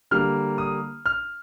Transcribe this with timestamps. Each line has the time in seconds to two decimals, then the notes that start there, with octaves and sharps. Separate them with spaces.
0.11 D3 G3 A#3 F6
0.58 D#6
1.06 F6